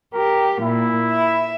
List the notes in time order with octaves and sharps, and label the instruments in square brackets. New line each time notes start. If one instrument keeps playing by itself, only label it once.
[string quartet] G4 [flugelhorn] A#4
[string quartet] A#2 [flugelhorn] E4
[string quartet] E5